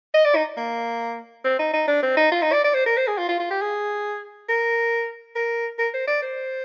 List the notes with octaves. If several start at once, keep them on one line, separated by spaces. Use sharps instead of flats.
D#5
D5
D#4
A#3
C4
D#4
D#4
D4
C4
D#4
F4
D#4
D5
D5
C5
A#4
C5
G#4
F4
F4
F4
G4
G#4
A#4
A#4
A#4
C5
D5
C5